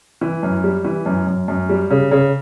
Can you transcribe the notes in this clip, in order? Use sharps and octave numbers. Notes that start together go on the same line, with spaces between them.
E3
F#2
G3
E3
F#2
F#2
F#2
G3
C#3
C#3